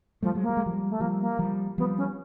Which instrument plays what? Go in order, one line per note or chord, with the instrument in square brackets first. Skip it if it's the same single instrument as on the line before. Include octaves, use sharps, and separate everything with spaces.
[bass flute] F3 [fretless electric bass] G3 A3
[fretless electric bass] F#3 G#3
[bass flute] A#3
[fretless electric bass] G3
G#3
F3 G3
[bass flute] A3
[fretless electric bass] F3 G3 [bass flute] A#3
[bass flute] A#3
[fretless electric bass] F3 G3
[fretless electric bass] F3 G3 [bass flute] B3
[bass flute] C#4